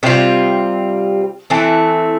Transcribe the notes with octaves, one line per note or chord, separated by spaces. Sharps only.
C3 G3 C4 F4
E3 A3 C4